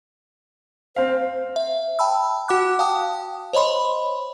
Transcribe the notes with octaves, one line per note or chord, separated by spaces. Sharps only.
C4 C5 F5
E5
G5 A5 B5 E6
F#4 F#5 D6 F#6
F5 G5 A5 D#6
C5 C#5 D#5 B5 C6